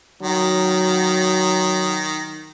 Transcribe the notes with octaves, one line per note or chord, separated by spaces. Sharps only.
D#3 F#3